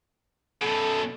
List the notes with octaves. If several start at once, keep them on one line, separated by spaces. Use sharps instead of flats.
F#2 B2 A4